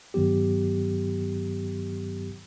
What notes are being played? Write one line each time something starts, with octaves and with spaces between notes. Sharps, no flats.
G2 D#3 F#3 B3 G4